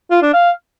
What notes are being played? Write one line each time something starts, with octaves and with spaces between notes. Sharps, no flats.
F4
D4
F5